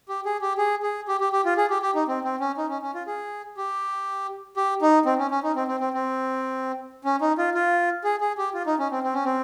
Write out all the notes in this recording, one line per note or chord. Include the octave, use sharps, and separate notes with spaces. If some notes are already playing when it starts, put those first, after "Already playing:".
G4
G#4
G4
G#4
G#4
G4
G4
G4
F4
G#4
G4
G4
D#4
C4
C4
C#4
D#4
C#4
C#4
F4
G#4
G4
G4
D#4
C4
C#4
C#4
D#4
C4
C4
C4
C4
C#4
D#4
F4
F4
G#4
G#4
G4
F4
D#4
C#4
C4
C4
C#4
C4